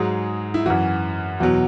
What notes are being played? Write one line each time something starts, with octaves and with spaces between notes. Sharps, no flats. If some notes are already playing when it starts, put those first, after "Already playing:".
Already playing: G#2 F#3 G#4
E4
F#2 E3 F#4
E2 B2 F#3 F#4